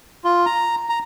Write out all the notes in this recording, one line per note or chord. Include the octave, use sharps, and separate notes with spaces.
F4
A#5
A#5